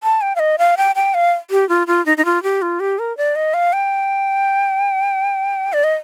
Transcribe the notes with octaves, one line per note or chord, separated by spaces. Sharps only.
A5
G5
F5
D#5
F5
G5
G5
F5
G4
F4
F4
D#4
D#4
F4
G4
F4
G4
A#4
D5
D#5
F5
G5
D5
D#5